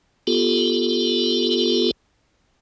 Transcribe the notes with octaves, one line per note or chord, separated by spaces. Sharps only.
B3 F4 G4 A4